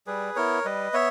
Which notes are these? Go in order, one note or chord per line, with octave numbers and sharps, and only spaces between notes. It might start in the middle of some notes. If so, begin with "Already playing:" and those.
G3 G#4 B4
B3 E4 A#4 C#5
G3 B4 D#5
B3 C#5 E5